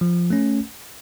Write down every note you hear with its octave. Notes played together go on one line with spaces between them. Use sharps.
F3
A3 C#4